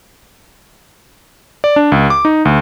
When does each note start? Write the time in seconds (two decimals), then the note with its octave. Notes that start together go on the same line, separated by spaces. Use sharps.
1.64 D5
1.76 D4
1.92 C#2
2.10 D6
2.25 D#4
2.45 D2